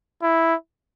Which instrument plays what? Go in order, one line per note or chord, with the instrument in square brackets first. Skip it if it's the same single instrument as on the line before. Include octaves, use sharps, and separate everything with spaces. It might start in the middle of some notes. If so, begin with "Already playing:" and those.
[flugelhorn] E4